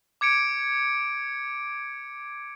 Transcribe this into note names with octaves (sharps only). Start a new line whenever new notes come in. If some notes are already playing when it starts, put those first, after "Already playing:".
D6 G#6 C#7 D7